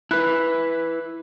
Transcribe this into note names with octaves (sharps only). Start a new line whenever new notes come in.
E4 B4 B5 F#6